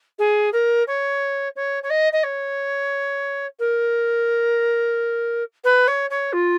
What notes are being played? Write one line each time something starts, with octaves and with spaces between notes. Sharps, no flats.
G#4
A#4
C#5
C#5
C#5
D#5
D#5
C#5
A#4
B4
C#5
C#5
F4